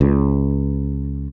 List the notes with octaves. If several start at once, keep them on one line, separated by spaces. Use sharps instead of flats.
C#2